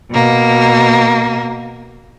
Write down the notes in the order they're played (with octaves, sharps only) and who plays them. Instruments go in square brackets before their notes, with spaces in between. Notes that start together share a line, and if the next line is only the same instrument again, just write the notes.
[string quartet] B2 A#3